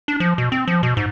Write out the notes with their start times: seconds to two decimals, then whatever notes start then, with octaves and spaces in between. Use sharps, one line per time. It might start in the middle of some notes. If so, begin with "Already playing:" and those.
0.08 D4
0.20 F3
0.38 B2
0.52 C4
0.68 F3
0.83 B2
0.97 G#2